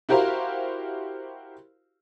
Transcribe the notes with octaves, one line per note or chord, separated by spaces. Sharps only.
E4 F#4 G4 A#4 C5 F5